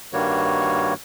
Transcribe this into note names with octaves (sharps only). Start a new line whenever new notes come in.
G2 D#3 G3 A#3 F#4 C#5